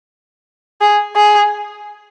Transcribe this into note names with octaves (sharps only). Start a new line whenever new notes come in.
G#4
G#4